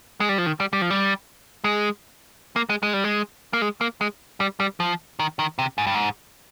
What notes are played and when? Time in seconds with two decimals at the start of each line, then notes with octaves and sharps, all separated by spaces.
0.20 G#3
0.29 G3
0.38 F3
0.46 D#3
0.60 G3
0.73 G3
0.82 F3
0.91 G3
1.64 G#3
2.56 A#3
2.70 G#3
2.83 G#3
2.93 G3
3.04 G#3
3.53 A#3
3.62 G#3
3.81 A#3
4.01 G#3
4.40 G3
4.60 G3
4.80 F3
5.19 D#3
5.39 D#3
5.59 C3
5.78 G#2
5.87 G2
5.95 G#2